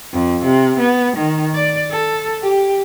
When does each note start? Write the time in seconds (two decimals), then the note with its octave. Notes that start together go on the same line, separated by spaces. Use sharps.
0.13 F2
0.45 C3
0.79 B3
1.17 D#3
1.55 D5
1.91 A4
2.43 G4